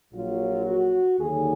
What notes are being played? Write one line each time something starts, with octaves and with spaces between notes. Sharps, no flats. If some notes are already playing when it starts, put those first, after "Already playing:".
A#1 A#2 F#3 F4
F#4
D#2 D3 F#3 G#4